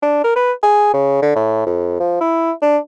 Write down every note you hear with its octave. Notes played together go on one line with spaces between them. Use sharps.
D4
A#4
B4
G#4
C#3
D3
A2
F2
F3
E4
D4